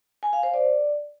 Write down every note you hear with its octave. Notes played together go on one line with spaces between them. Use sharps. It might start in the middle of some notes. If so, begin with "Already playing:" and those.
G#5
F5
C5
D5